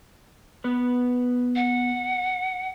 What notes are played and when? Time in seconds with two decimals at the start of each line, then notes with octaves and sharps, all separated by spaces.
0.64 B3 B4
1.56 F#5